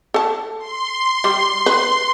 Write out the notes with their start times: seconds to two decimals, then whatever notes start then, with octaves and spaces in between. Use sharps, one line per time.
0.14 A4 A5
0.58 C6
1.24 G3
1.66 B4